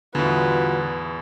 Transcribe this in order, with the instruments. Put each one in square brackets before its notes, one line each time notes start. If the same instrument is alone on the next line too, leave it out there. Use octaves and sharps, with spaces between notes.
[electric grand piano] E2 A2 [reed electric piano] D3 [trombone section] G3 F4 F#4 [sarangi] B4